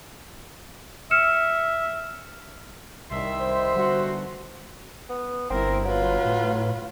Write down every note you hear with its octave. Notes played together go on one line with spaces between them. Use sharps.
E5 F6 C#7 E7
C2 D#3 G3 D#5 E5 C6
C5
D3 G3 F#4
B3
G1 C4 E4 A#4
F#3 F4 B4
A2